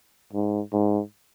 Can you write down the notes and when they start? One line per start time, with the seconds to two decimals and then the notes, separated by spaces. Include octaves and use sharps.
0.33 G#2
0.73 G#2